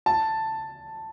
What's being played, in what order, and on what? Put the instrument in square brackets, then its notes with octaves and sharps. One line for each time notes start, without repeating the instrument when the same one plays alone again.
[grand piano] A5